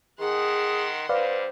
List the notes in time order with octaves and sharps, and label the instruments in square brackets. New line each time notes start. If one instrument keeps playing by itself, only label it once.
[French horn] D#3 [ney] G#4 [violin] F#5 C6
[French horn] G2 [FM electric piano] B4 D5 F5 [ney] C5